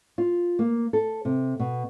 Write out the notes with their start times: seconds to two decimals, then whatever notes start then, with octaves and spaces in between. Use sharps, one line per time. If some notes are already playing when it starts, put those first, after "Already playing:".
0.18 F4
0.59 A#3
0.93 A4
1.25 C3
1.59 B2